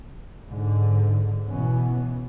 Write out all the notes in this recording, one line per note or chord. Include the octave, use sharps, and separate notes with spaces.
G#2 D3
B2 E3 B3 C#4